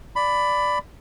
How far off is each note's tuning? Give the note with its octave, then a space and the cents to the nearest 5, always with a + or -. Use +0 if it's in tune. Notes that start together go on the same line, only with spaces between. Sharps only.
D5 +0 B5 +15